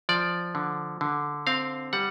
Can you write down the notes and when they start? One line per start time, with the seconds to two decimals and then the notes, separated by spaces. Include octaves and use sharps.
0.09 F3 D5
0.55 D3
1.01 D3
1.47 C4 F5
1.93 G3 F#5